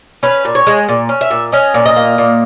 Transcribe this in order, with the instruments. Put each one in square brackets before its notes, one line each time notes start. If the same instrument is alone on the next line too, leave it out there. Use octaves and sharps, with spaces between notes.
[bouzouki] C#4 B4
A#2
C#5
G#3
A#2
C#4
E5
A#2
C#4 D#5
A#2
D#5
A#3
A#2